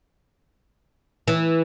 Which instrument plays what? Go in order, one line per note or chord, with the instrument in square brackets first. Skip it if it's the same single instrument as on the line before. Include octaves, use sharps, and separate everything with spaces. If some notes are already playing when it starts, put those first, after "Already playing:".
[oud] E3